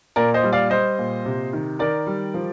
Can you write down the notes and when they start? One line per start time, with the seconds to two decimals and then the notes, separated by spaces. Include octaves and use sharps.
0.16 A#2 A#4 D5
0.34 C5 D#5
0.43 G3
0.53 D5 F5
0.70 G3 C5 D#5
0.98 A#2
1.25 C3
1.53 D#3
1.79 D#3 A#4 D5
2.07 G3
2.34 F3